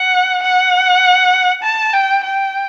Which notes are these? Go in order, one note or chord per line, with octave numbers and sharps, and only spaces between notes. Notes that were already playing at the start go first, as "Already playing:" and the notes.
Already playing: F#5
F#5
A5
G5
G5